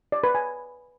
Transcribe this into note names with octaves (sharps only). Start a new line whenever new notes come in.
D5
B4
G#5